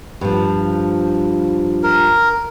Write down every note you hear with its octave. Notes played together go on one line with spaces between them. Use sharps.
G2 F3
A#4